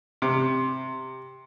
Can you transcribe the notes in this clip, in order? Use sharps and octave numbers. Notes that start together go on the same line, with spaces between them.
C3